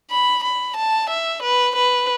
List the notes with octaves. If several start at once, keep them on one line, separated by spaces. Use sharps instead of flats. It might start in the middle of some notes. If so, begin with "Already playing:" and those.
B5
B5
A5
E5
B4
B4